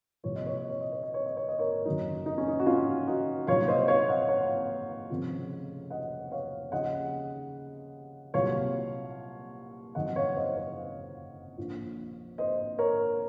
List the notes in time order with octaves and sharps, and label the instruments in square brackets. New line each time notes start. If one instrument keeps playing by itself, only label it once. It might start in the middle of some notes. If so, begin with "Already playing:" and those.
[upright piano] C2 A#2 F3 C#5
D#5
C#5
D#5
C#5
D#5
C#5
D#5
C#5
D#5
C#5
D#5
A#4 C#5
F#1 F#2 D#3 F#3 D#4
D#4
C#4
D#4
F#4
C#4 F4
D#4 F#4
C2 A#2 F#3 C#5 F5
C5 D#5
C#5 F5
D#5 F#5
C#5 F5
F1 F2 C#3 F3
D#5 F#5
C#5 F5
D#2 C#3 F3 D#5 F#5
C2 A#2 F#3 C#5 F5
F#1 F2 D#3 F#3 D#5 F#5
C#5 F5
C5 D#5
C#5 F5
A#1 A#2 F3
C5 D#5
A#4 C#5